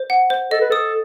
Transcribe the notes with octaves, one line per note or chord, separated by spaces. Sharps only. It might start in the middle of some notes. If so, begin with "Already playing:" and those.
Already playing: C5
F#5
C5
A4 D#5
B4
A4 D#6